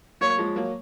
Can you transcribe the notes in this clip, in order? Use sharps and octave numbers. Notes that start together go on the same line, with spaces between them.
F#3 A#3 C#5
F3 G#3
F#3 A#3